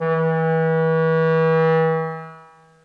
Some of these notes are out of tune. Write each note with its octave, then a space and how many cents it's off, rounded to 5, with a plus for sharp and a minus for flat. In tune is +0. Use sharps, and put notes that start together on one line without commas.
E3 -35